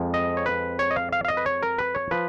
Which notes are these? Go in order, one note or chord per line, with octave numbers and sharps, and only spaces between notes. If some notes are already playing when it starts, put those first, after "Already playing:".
Already playing: F2 F3 G#3
D#5
C#5
B4
C#5
D#5
F5
F5
F5
D#5
B4
C#5
A#4
B4
C#5
F3 B4